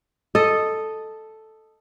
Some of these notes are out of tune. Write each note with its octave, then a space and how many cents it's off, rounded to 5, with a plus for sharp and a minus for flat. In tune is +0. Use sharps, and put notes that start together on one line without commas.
A4 +0 D#5 -5